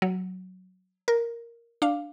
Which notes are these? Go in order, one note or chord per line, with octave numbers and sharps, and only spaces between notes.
F#3
A#4
D4 F5